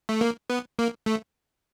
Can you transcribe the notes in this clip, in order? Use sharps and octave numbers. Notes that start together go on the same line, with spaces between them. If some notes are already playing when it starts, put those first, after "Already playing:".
A3
A#3
B3
A#3
A3